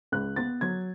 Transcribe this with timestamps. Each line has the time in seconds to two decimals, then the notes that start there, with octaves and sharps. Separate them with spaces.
0.12 C#2 F#6
0.36 B3 A6
0.61 F#3 G#6